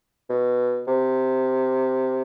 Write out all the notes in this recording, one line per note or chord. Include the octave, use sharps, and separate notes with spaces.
B2
C3